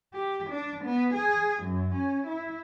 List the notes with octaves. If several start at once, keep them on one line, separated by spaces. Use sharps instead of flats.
G4
D4
B3
G#4
F#2
C#4
E4